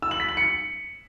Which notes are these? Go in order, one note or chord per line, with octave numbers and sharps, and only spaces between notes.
E6
F#7
B6
F#7
C#7